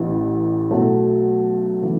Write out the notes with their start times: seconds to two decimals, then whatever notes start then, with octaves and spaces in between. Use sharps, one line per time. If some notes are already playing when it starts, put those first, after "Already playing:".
Already playing: A1 A2 E3 B3 E4
0.71 B1 B2 F#3 A3
1.82 C#3 E3 A3